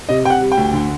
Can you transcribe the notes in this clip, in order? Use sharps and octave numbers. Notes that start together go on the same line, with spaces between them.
C3 D#5
C3 G5
F#5
G3
G5
D2
D3